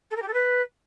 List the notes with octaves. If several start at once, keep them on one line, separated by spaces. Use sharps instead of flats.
A4
A#4
G4
A4
B4